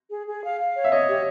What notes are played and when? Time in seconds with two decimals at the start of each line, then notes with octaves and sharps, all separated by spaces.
0.10 G#4
0.27 G#4
0.43 F5
0.59 F5
0.76 C#5
0.84 E5
0.92 C#5 D#5
1.08 G4